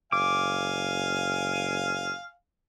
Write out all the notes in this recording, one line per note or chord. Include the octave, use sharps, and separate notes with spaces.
F#1 F5 G#5 D6